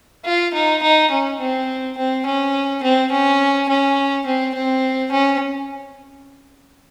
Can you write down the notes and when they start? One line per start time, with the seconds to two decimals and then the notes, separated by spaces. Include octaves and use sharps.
0.25 F4
0.54 D#4
0.83 D#4
1.11 C#4
1.40 C4
1.98 C4
2.26 C#4
2.83 C4
3.12 C#4
3.69 C#4
4.26 C4
4.55 C4
5.12 C#4